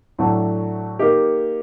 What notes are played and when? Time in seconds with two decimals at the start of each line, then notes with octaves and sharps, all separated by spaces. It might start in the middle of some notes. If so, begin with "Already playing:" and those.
0.19 A2 F#3 A3 D4
0.99 A#3 D#4 G4